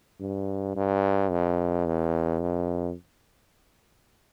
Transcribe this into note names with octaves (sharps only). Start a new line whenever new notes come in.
G2
G2
F2
E2
F2